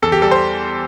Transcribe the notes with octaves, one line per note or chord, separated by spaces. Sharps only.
E2 A4
G4
G3 A4
C5